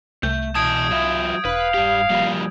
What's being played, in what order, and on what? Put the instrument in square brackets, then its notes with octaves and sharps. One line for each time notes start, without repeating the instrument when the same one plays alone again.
[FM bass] C2 [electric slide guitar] A3 [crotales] G6
[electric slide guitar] B2 E3 A5 [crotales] D#6 G#6 D7
[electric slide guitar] F#3 F4 E5
[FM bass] E1 [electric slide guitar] B4 [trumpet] F5
[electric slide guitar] G2 G4
F3 G3 A#3